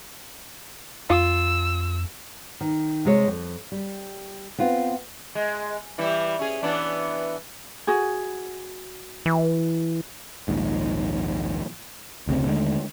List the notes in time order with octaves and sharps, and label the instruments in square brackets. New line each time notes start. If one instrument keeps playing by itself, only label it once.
[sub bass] F2 [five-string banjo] F4 [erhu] E6
[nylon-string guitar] D#3
C3 G#3 C#5
F2
G3
B3 C4 F4
[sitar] G#3
E3 G3 E4
C#4 G#4
E3 B3 D4
[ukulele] F#4 G#4
[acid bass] E3
[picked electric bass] A#1 D#2 G#2
F1 D2 C#3 C4
D#2 D3 G#3 A3